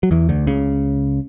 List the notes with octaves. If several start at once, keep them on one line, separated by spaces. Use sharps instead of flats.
F#3
E2 E3
D2 D3
C#2 C#3